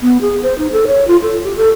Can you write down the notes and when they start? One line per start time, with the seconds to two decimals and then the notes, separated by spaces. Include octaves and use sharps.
0.02 B3
0.21 G#4
0.43 C5
0.58 D#4
0.72 A4
0.87 C#5
1.07 F4
1.22 A4
1.44 G4
1.57 A4